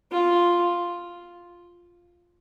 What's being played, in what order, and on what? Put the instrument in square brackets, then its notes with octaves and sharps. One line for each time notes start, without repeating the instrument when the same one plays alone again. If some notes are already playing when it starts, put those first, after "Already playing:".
[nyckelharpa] F4